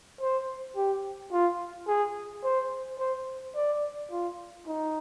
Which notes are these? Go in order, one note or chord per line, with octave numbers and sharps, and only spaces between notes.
C5
G4
F4
G#4
C5
C5
D5
F4
D#4